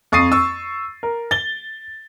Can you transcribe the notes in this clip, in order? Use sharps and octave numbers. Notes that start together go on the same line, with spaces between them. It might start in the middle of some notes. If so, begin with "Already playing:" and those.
F2 C#6 D#6 A6 C7 D#7
C#6 E6
A#4
A6 G7